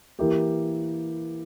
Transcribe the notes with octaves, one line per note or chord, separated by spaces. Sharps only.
E3 A#3 E4 G4 A#4